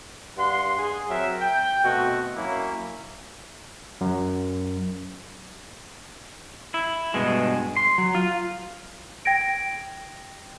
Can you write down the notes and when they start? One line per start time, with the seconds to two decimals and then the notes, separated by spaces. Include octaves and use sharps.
0.38 G2 F#5 C6
0.79 G#4
1.09 F#3 C4 A#4 E5
1.41 G5
1.83 B2 A3 C4 F#4
2.36 F#3 A#3 C#4 E4
4.01 F#2
6.74 E4
7.14 G2 B2 G#3
7.77 C6
7.98 F#3
8.15 F4
9.25 G5 G#6 A#6 D7